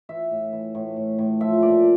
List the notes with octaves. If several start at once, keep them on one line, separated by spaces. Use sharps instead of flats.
E3 E5
A2
E3
A2
A2
A2
F3 E5
A#2 D5